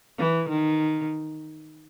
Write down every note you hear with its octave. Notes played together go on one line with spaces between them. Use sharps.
E3
D#3